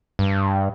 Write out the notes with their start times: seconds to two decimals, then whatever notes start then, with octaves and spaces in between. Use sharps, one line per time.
0.19 G2